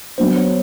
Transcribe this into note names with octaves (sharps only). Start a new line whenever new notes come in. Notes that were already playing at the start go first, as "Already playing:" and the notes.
F#3 B3 D4 C5
C#5